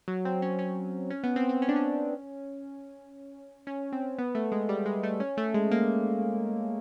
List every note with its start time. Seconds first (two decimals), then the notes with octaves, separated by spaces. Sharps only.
0.08 F#3
0.25 C4
0.42 C#4
0.59 C#4
1.10 C#4
1.24 B3
1.36 C4
1.49 C4
1.62 C#4
1.69 D4
1.76 C#4
3.67 C#4
3.92 C4
4.19 B3
4.35 A3
4.52 G#3
4.69 G3
4.86 G#3
5.03 A3
5.20 C#4
5.37 A3
5.54 G#3
5.71 A#3